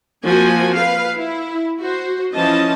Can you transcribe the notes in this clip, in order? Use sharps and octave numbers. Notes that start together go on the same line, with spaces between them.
F3 A#3 C4 F#4 G#5
B4 F5
E4
F#4 C5
E3 F3 C#4 D#5 A5